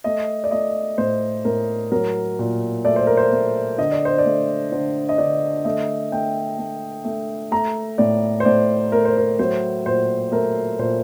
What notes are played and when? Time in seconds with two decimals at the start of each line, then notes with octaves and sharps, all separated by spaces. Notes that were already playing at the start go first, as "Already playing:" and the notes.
0.04 A3 D#5
0.44 D5
0.51 A3 D#5
0.98 A2 C5
1.45 A2 A#4
1.92 F#3 A#4
2.39 A#2
2.84 A3 D5
2.96 C5
3.07 A#4
3.17 C5
3.32 A3
3.78 D3 D#5
3.91 D5
4.05 C5
4.18 D5
4.26 A3
4.72 D3 C5
5.09 D#5
5.18 D3 D5
5.65 A3 D#5
6.12 A3 G5
6.59 A3
7.05 A3
7.51 A3 A#5
7.98 A2 D5
8.40 C5
8.45 A2 D5
8.92 A3 A#4
9.05 C5
9.17 A#4
9.39 F#3 C5
9.86 A#2 C5
10.32 A3 A#4
10.79 A#2 C5